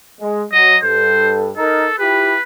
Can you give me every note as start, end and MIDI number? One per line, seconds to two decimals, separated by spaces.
0.20 0.43 56
0.53 0.75 54
0.53 0.77 75
0.83 1.49 43
0.83 1.49 69
0.83 1.36 72
1.57 1.85 63
1.57 1.96 69
1.57 1.85 70
1.99 2.34 64
1.99 2.34 65
1.99 2.34 67
1.99 2.42 71